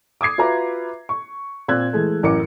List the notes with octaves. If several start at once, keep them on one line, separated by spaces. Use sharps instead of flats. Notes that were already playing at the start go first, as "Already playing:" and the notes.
D6 D#6 G#6 C7
F4 F#4 B4 E5 A#5 D6
C#6
A#2 C4 E6 F#6 G#6
E3 G#3 A3
A1 F#2 A#4 D6 C#7